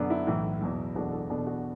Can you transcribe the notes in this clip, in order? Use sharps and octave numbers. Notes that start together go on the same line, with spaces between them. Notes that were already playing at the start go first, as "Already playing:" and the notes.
Already playing: F#2 D3 B3 D4
E4
B1 A2 E3
E2 B2 F#3
F#1 E2 B2 A3 D4 F#4
A4
E2 B2 B3 D4 A4
F#4